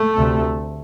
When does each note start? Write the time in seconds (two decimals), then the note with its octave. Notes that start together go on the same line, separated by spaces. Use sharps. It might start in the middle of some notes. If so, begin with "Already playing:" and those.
Already playing: A3
0.16 D2 C3